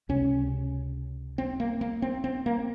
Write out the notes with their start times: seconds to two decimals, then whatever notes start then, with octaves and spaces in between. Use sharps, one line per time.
0.09 C#2 C3 C#4
1.38 C4
1.60 A#3
1.81 A#3
2.02 C4
2.24 C4
2.46 A#3